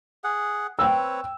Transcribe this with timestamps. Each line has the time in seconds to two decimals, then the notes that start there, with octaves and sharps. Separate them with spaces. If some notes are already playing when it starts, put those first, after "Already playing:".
0.24 G#4 F#5
0.79 C4 B4 C#5 G5 E6